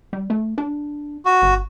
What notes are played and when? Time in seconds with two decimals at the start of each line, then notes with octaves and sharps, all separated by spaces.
0.13 G3
0.30 A3
0.58 D4
1.25 F#4
1.42 G1